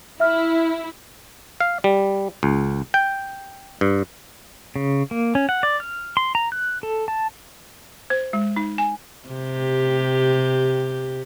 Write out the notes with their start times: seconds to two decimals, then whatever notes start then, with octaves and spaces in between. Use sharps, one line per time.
0.20 E4 E5 F6
1.60 F5
1.84 G3
2.43 C#2
2.94 G5
3.81 G2
4.76 C#3
5.11 A#3
5.35 C#4
5.49 F#5
5.63 D5
5.80 F6
6.17 C6
6.35 A#5
6.52 F#6
6.83 A4
7.08 A5
8.10 C5
8.33 G#3
8.56 D#4
8.78 G#5
9.29 C3 G4